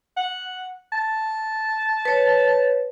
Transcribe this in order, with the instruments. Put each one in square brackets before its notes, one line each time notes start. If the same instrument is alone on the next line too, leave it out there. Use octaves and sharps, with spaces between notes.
[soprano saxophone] F#5
A5
[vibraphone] B4 C#5